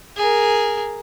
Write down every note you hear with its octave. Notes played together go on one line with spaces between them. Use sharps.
G#4 A#4